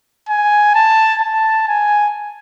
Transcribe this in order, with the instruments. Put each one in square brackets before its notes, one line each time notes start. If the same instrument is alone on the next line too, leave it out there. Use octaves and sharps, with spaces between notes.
[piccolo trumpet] G#5
A5
A5
G#5